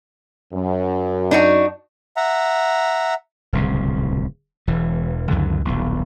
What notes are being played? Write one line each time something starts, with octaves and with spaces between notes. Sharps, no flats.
F#2
D4 D#4 F#4
E5 F#5 A#5
D1 C2 C#3
E1 E3
C#2 F#2 D3 D#3
D#1 B1